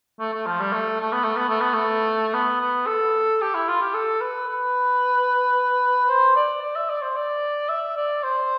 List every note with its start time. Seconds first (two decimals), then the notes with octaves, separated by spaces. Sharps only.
0.20 A3
0.34 A3
0.46 F3
0.60 G3
0.72 A3
1.00 A3
1.12 B3
1.24 A3
1.36 B3
1.49 A3
1.61 B3
1.73 A3
2.34 B3
2.60 B3
2.87 A4
3.41 G4
3.55 E4
3.68 F4
3.81 G4
3.94 A4
4.21 B4
4.47 B4
6.09 C5
6.36 D5
6.62 D5
6.76 E5
6.89 D5
7.02 C5
7.16 D5
7.69 E5
7.97 D5
8.23 C5